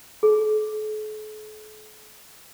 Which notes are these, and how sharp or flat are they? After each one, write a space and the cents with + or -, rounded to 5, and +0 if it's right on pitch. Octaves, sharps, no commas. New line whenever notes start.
A4 -45